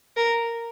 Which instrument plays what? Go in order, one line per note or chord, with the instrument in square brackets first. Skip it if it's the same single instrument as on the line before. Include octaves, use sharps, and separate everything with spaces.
[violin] A#4